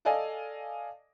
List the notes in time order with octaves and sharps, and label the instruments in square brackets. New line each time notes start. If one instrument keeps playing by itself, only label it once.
[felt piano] A4 D5 D#5 F5 G#5